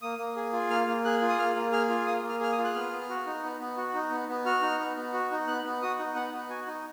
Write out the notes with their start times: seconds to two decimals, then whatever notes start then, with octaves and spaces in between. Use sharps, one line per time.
0.02 A#3 D#6
0.18 A#3
0.36 G#4
0.53 F4
0.70 A#3 F6
0.87 A#3
1.05 G#4 F#6
1.21 F4
1.29 D#6
1.38 A#3 F6
1.56 A#3
1.72 G#4 F6
1.89 F4
2.06 A#3 D#6
2.24 A#3
2.29 F6
2.40 G#4 F6
2.52 D#6
2.58 F4
2.64 F#6
2.74 B3 F6
2.92 B3
3.09 F#4
3.26 D#4
3.43 B3
3.60 B3
3.77 F#4
3.94 D#4
4.11 B3
4.29 B3
4.45 F#4 F6
4.62 D#4
4.80 B3
4.97 B3
5.13 F#4
5.31 D#4
5.47 B3 F#6
5.64 B3
5.82 F#4 D#6
5.99 D#4
6.15 B3 F#5
6.33 B3
6.50 F#4 G#5
6.67 D#4